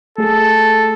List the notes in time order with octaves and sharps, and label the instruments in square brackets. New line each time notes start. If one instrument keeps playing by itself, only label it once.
[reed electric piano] A3 G#4 [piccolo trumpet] A4